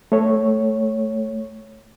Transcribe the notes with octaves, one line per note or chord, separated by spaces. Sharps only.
A3 C#5